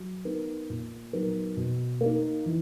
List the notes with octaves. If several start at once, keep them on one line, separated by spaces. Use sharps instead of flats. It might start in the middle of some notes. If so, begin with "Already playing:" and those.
Already playing: F#3
B3 D#4 A#4
A#2
F#3 B3 D#4 A#4
B2
A#3 D#4
E3